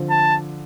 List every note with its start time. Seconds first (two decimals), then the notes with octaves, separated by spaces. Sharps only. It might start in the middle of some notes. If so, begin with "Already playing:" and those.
Already playing: D3 F3 C4
0.10 A5